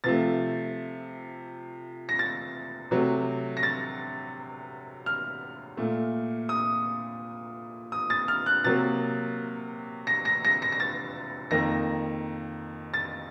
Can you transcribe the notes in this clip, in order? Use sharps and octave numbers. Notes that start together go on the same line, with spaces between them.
C3 F3 A3 A6
A#6
A6
C3 F#3 A3
A#6
A6
F6
A#2 A3
D#6
D#6
A6
F6
F#6
C3 F#3 A#3 A6
A#6
A#6
A#6
A#6
A#6
A6
F2 D#3 A#3 A#6
A6